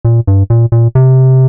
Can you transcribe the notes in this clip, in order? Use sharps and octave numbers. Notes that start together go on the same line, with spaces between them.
A#2
G2
A#2
A#2
C3